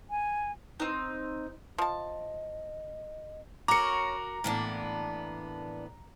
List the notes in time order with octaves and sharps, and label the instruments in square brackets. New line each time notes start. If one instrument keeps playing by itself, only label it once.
[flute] G#5
[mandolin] C4 D#4
[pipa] F3 A5 [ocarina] D#5
[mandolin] C#4 C#5 [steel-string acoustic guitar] F#4 A#4 [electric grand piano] A#5 C#7 [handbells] D6
[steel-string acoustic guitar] A2 E3 B3 [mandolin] A#3 D4